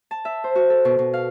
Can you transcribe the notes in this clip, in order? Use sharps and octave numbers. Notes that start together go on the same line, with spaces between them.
A5
E5
C5
F#4
A4
B2
B2
F5